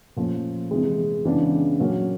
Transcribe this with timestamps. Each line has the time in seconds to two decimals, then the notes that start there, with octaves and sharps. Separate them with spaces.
0.17 A#2 F3 A3 C#4
0.71 C3 E3 G#3
1.25 C#3 E3 G#3 B3 D4
1.80 A#2 F#3 A#3 C#4